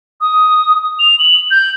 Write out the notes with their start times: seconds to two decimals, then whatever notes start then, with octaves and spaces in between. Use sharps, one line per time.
0.21 D#6
0.99 F7
1.19 F#7
1.51 G6